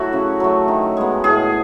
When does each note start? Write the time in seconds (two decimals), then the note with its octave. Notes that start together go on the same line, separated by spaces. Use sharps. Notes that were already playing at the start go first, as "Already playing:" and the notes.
Already playing: F#3 A3 E4 F#4
0.13 C#3
0.40 F#3 A3
0.68 D#3
0.97 G#3 B3
1.24 A2 G#4